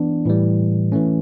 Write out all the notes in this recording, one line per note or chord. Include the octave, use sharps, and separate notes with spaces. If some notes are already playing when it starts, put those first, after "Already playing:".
Already playing: E3 B3 D4
A2 E3 G3
E3 A3 C#4